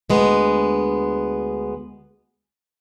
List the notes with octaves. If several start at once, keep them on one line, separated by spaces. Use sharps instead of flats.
D2 G#3 B3